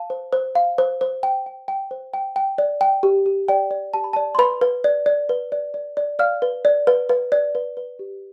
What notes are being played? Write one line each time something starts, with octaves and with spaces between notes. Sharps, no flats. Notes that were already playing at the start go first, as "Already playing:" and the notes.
Already playing: F5 A5
C5
C5
F5
C5
C5
G5
G5
G5
C5
G5
G5
D5
G5
G4
G4
D5 G5
D5
G4 A5
B5
D5 A5
C6
B4 B5
B4
D5
D5
B4
D5
D5
D5
D5 F5 F6
B4
D5
B4
B4
D5
B4
B4
G4